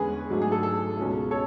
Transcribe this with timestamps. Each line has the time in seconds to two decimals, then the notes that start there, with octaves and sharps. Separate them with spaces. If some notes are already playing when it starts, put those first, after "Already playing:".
Already playing: E2 D3 G#3 C#4 G#4 B4
0.30 G#2 F#3 A3 D4
0.42 G#4
0.52 A4
0.63 A4
0.97 C#2 B2 G#3 C#4
1.31 A4 C#5